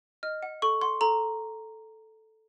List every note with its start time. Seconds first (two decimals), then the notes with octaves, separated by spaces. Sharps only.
0.23 D#5 F6
0.43 F#5
0.62 A4 C#6
0.81 F#5 C6
1.01 A4 A#5